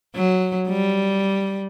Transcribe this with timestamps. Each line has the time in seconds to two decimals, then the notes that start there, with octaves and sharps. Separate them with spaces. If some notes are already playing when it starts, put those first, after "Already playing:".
0.16 F#3
0.68 G3